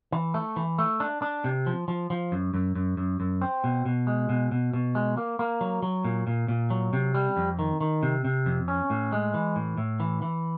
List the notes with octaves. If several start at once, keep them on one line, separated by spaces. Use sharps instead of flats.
E3
A3
E3
A3
D4
D4
C3
F3
F3
F3
F#2
F#2
F#2
F#2
F#2
C4
B2
B2
G#3
B2
B2
B2
G#3
A#3
A#3
F#3
F#3
A#2
A#2
A#2
F#3
C3
G3
F2
D#3
D#3
C3
C3
F2
C#4
A2
G#3
E3
A2
A2
E3
E3